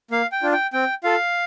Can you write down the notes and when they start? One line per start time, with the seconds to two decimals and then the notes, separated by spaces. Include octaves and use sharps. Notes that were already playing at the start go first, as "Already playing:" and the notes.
0.11 A#3 F5
0.32 G5
0.43 D4 F4
0.53 G5
0.73 C4 G5
1.04 F4 A4 F5